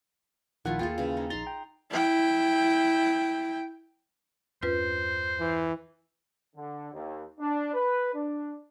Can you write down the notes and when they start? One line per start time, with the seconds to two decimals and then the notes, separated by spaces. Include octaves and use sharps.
0.65 A#1 D#3 A3 E4 F4 F#5
0.79 D#2 A#3 F4 G#4 A4 G5
0.98 C#3 E3
1.17 D#4
1.30 A#1 D#4 A#5 C6 A6
1.47 G5
1.90 E4 G5
4.63 E2 G2 C#4 F4 B4 C5
5.39 E3
6.56 D3
6.93 D#2
7.39 D4
7.74 B4
8.14 D4